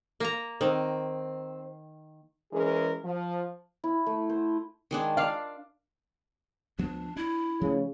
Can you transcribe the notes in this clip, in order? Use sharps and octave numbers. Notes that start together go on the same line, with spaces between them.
A#3 A#5
D#3 C4
E3 G#3 C#4 G#4 A#4
F3
E4
A3
C5
D#3 G#3 D4
D4 D5 F5
D2 F3 B3 D4
D4 E4
C#3 F3 A3